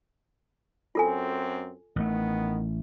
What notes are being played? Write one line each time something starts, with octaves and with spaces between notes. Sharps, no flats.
F#2 C4 F4 A4 G#5
A1 D#3 A3 B3